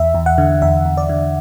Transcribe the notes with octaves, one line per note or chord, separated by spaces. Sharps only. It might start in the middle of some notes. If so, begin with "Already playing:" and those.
Already playing: E2 E5
E2
F#5
D3
E2 E5
E2
D5
D3